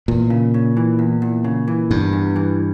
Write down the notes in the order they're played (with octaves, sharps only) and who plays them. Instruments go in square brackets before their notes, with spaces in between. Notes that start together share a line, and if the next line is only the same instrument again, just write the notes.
[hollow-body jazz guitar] E2 [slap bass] A#2
[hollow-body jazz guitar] C#3
C#3
E3
E2
E2
C#3
E3
[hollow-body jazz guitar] E2 [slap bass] G2
[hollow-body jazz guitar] E2
E3